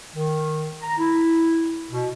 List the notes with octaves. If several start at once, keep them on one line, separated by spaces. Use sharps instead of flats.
D#3
A#5
E4
B2